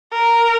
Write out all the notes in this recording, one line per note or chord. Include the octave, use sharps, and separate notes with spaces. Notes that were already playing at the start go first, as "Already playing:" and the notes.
A#4